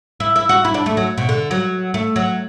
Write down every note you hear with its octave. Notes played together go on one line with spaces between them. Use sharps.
E4
E4
F#4
E4
D4
A3
F#3
B2
D3
F#3
A3
F#3